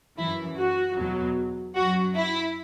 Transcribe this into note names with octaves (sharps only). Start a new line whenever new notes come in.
F#2 E3 E4
F#4
E2 B2 F#3
F#2 F#3 F#4
E4